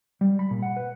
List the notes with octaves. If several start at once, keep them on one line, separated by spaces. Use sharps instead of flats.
G3
B5
A#2
F#5
B4